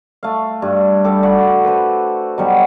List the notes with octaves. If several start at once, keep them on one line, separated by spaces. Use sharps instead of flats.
A3 F5
G2
G3 A4 D6
F#4 D5 F#5 B5
B4 C5
B2 F#3 G3 F#5